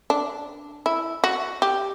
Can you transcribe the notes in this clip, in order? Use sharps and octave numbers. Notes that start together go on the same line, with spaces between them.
D4
E4
F#4
G4